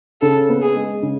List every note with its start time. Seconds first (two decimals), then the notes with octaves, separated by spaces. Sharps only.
0.21 C#3 A4
0.49 B3
0.62 G#4
0.75 G#3
1.03 C#3